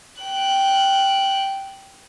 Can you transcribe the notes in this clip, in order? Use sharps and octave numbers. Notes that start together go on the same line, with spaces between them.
G5 F#6